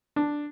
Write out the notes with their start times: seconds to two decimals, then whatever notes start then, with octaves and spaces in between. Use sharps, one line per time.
0.16 D4